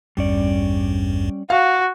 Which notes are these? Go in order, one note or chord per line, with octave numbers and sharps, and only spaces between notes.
A1 E2 G2 G3 C#4 D5
F#4 F5